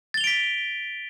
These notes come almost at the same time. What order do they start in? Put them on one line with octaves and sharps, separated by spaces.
A6 G7 F7 D7 B6